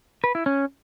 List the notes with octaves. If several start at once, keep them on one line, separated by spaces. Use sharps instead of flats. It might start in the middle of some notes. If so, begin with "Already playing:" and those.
B4
E4
C#4